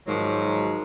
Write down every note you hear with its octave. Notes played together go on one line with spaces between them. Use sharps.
G#2 D#3 F3 F#3